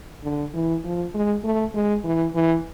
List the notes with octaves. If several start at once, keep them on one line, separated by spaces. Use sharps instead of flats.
D3
E3
F3
G#3
A3
G#3
E3
E3